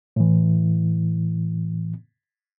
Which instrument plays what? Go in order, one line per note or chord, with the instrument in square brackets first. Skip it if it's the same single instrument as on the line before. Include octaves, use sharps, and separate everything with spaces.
[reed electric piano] A2 E3